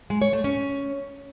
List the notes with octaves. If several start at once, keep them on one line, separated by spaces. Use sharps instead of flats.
G#3
C#5
A3
C#4